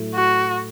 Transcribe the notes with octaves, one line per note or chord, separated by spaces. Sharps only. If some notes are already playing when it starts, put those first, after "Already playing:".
Already playing: A2 F#3 A3 E4
F#4